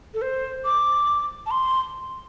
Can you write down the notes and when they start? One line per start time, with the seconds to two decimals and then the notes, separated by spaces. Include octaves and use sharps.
0.14 A4
0.22 C5
0.65 D6
1.46 A5
1.51 C6